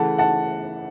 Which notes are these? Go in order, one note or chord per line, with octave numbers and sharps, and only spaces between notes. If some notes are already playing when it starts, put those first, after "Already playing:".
Already playing: C#3 E3 A3 F#5 A5
F#5 A5